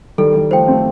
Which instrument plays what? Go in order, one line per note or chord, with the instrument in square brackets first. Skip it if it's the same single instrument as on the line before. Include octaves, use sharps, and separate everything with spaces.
[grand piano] D#3 G3 [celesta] A4
[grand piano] D#3 G3
[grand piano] F3 A3 [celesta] C5 G5
[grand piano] A3 C4